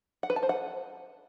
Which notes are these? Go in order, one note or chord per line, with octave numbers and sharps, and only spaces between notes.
F#5
B4
A5
C5
F#5